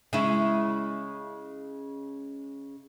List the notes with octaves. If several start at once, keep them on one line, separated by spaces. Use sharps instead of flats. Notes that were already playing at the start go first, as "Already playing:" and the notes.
C#3 G#3 E4